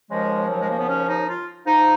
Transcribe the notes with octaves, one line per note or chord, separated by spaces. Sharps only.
D#2 C#3 F3 G#3
F#3
G#3
A#3
B3
C#4
D#4
F4
G#2 F3 D#4